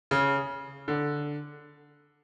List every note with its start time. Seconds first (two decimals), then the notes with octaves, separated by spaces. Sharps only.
0.11 C#3
0.88 D3